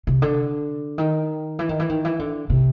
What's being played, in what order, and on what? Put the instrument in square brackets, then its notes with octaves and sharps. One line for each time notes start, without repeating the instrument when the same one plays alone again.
[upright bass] C3
D3
D#3
E3
D#3
E3
D#3
E3
D3
C3